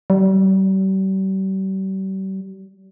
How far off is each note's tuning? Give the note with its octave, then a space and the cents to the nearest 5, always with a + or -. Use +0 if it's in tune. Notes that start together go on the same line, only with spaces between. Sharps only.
G3 -40